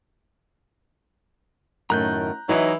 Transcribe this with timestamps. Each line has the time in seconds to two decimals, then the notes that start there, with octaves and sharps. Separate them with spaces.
1.90 F#2 A2 D#3 A#5 F#6 G6
2.49 E3 F#3 D#4 E4 B4 D#5 E5